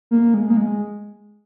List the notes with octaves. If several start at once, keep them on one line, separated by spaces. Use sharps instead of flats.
A#3
G#3
A#3
G#3